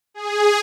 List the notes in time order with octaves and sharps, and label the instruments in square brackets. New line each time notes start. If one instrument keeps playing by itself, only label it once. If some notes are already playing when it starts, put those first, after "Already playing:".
[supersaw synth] G#4